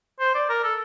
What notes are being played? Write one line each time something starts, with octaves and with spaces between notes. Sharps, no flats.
C5
D5
A#4
A4